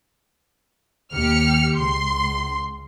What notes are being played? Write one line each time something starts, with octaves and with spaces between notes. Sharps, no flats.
D#2 G4 F6 C#7
C#2 C6